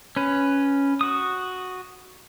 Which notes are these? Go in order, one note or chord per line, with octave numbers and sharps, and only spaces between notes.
C#4 B4
F#4 D#6